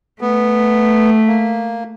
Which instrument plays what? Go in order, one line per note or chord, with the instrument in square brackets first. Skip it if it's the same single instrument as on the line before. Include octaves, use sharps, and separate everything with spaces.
[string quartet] A3 [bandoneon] B3
[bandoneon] A#3